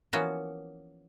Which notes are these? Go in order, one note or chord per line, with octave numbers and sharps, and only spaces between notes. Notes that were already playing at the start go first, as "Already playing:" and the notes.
E3 F3 A#3 B3 C#4 F#4